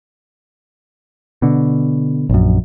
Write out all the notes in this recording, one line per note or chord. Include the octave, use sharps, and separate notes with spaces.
B2 D3
A#1 F#2